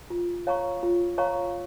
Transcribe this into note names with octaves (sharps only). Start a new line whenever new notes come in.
F4
C#5 F5 A#5 C#6
F4
C#5 F5 A#5 C#6